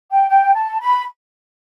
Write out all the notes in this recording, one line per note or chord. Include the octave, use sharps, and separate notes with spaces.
G5
G5
A5
B5